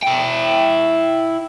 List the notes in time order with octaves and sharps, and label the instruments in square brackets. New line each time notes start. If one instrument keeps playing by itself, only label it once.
[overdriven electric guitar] E4 G5